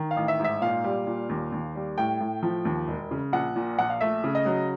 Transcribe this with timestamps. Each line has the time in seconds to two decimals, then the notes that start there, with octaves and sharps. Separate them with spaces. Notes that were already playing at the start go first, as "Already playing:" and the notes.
Already playing: D#3
0.11 F5
0.16 A1
0.28 E5
0.40 G#2 E5
0.62 A#2 F5
0.84 G3
1.07 A#2
1.29 D#2
1.52 D#2
1.75 G3
1.98 A2 G5
2.20 A2
2.43 F3
2.65 D#2
2.88 E1
3.11 C#3
3.32 A#1 F#5
3.56 A#2
3.79 A#1 F#5
3.90 F5
4.01 A3 E5
4.24 C#3
4.35 D#5
4.45 F#3